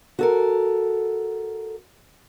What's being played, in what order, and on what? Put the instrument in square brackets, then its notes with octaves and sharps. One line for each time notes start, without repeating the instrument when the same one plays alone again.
[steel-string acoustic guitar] F#4 A4 A#4